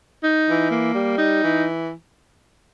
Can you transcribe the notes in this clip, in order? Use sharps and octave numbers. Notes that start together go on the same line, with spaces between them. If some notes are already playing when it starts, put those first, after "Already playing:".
D#4
E3
A#3
G3
D#4
E3